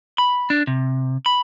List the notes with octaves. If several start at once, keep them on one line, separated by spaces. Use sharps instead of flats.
B5
D4
C3
B5